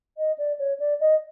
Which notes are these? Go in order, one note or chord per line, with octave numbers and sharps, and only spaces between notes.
D#5
D5
C#5
D5
D#5